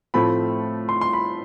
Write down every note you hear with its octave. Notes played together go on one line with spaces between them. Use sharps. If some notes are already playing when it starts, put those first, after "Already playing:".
A2 F3 A3 C4 B5
C6
C6
B5